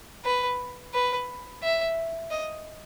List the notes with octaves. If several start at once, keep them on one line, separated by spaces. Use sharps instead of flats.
B4
B4
E5
D#5